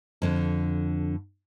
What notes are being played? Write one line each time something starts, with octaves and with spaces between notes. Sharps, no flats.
F2 D3